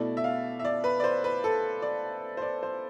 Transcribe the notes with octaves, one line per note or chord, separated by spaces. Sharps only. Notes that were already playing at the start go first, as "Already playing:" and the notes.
Already playing: B2 A3 E4 D5
E5
F5
E5
D5
B4
D5
C5
B4
A4
D5
C5
D5
C5